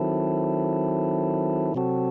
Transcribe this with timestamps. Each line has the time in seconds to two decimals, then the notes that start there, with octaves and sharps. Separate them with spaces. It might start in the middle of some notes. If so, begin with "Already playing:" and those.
Already playing: D#3 F#3 C4 E4 A4
1.75 C3 F#3 C4 F#4 A4